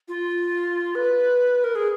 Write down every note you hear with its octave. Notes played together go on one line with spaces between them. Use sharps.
F4
B4
A#4
G#4